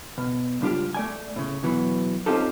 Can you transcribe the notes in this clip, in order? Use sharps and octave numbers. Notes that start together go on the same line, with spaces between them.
B2
C#2 G2 D4 F4 G4
A3 D5 G#5
A2 C#3
E2 B2 E3 F#3 B3
C4 C#4 D#4 F4 G4 A4